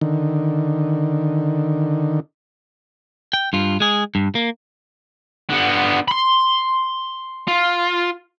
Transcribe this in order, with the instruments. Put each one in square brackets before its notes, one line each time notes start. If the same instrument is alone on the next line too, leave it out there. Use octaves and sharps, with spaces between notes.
[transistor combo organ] D3 D#3
[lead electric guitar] G5
G2 F4
G#3 G#4
G2
A#3
[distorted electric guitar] D3 B3
B5 C6
F4